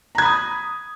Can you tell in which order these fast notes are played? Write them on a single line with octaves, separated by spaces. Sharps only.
A#5 G#6 B5 D#6